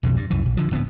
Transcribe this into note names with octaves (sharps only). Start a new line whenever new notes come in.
B1 F2 B2 D3
G2
C2 F#2 E3
A#1
D3 F3
D1 D3 A#3 B3